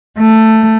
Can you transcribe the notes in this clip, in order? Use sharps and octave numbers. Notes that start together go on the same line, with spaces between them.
A3